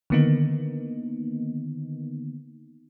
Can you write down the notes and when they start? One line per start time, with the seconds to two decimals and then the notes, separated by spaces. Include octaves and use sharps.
0.10 D3 D#3 A#3 B3 D#4